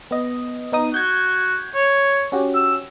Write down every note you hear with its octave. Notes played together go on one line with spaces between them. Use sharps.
B3 D#5
B3 D#4 D#6
F#4 G6 G#6
C#5
C#4 F#4 G4
E6